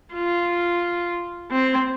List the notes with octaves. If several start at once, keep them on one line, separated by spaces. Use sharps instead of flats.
F4
C4